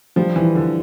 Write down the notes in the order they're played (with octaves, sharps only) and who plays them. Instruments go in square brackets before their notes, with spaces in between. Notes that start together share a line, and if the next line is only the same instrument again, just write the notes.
[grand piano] F3 [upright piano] G3 D4 G4
[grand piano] E3
D3